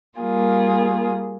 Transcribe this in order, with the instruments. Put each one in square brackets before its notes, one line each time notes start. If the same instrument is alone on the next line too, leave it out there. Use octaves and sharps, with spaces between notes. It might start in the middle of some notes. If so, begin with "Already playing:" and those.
[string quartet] G3 A#3 F4 G#4